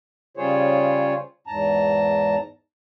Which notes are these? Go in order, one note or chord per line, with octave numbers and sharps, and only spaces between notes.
C#3 G3 F4 G#4 C5 C#5
E2 G#2 A5 A#5